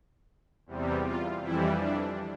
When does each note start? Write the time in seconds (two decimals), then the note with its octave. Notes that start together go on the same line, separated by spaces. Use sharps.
0.66 E2 C3 G3
1.04 F4
1.41 F2 E3 G3 E4
1.79 D4